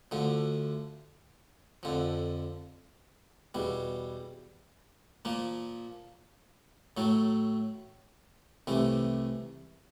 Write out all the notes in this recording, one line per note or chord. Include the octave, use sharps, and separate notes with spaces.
D2 D3 F3
F2 D3 F3
E2 B2 G3
A#2 F3 A#3
A2 F#3 A3
C2 C3 E3 A3